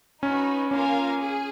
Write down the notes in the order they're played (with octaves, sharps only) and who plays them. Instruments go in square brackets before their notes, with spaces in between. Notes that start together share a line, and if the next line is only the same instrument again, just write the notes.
[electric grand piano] C#4 [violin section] D#4 F#4 B4
[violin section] A#3 F4 A#4 F5 G#5 [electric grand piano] C#4
[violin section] G#4